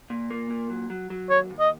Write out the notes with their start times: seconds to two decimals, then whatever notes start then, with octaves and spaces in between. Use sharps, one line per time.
0.10 A#2
0.30 A#3
0.50 A#2
0.70 F#3
0.90 F#3
1.10 F#3
1.30 D#2 C#5
1.50 D#2
1.60 D#5